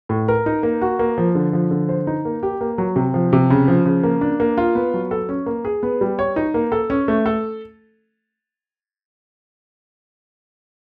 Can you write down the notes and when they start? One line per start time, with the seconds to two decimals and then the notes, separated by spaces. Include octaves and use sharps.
0.09 A2
0.28 A#4
0.46 D#4
0.63 A#3
0.81 F#4
0.99 A#3
1.18 F3
1.35 D3
1.53 F3
1.71 D3
1.89 C5
2.07 D#4
2.25 A#3
2.43 G4
2.61 A#3
2.78 F#3
2.96 C3
3.14 F3
3.33 C3
3.50 C#3
3.68 F3
3.85 C#3
4.03 A#3
4.21 D4
4.40 A#3
4.57 F4
4.75 B3
4.94 F#3
5.11 A4
5.29 C#4
5.46 A#3
5.65 G#4
5.83 B3
6.01 G3
6.19 C#5
6.36 D#4
6.54 A#3
6.72 A4
6.90 C#4
7.08 A3
7.26 A4